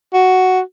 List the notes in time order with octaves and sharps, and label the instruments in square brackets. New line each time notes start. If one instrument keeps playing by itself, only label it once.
[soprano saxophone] F#4